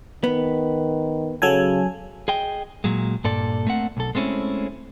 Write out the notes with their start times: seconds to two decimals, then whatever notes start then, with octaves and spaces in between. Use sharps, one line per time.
0.24 D#3 B3
1.42 C#3 F#3 A4 G#5
2.28 G#4 D#5 G5
2.84 A#2 F#3 G#3
3.24 G2 A#2 A4 D5
3.67 A3 A#3 C4 F#5
3.97 B1 A4
4.15 G#3 A3 C4 C#4 E4